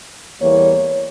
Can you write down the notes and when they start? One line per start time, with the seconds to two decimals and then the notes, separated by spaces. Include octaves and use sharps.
0.40 E2 E3 G3 A#3 C#5